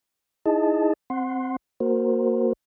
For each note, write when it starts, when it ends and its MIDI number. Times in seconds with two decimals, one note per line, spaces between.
0.46 0.93 63
0.46 0.93 64
0.46 0.93 68
0.46 0.93 75
0.46 0.93 81
1.10 1.56 60
1.10 1.56 78
1.10 1.56 84
1.80 2.53 58
1.80 2.53 66
1.80 2.53 70
1.80 2.53 72